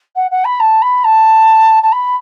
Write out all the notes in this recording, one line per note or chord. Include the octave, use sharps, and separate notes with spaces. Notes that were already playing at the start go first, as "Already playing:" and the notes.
F#5
F#5
B5
A5
B5
A5
A5
B5